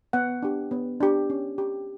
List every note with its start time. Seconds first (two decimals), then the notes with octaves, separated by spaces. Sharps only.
0.13 B3 F#5
0.43 D4 G4
0.71 B3
1.01 D4 G4
1.30 C#4
1.58 G4